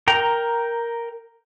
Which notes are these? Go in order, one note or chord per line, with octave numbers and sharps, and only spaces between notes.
A#4 G5 A#5